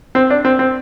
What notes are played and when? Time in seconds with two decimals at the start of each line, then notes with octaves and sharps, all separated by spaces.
0.15 C4
0.30 D4
0.45 C4
0.59 C4